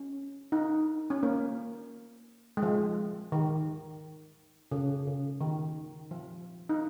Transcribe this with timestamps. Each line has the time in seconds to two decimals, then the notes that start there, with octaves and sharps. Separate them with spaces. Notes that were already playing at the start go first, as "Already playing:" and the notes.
Already playing: C#4
0.52 D#4
1.10 C#4
1.23 A#3
2.57 G#3
2.62 F3
3.32 D#3
4.72 C#3
5.07 C#3
5.41 D#3
6.11 F3
6.69 D#4